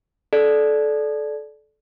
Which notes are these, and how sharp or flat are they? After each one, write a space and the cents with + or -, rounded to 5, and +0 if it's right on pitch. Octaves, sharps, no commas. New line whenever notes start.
A4 -25 D5 +0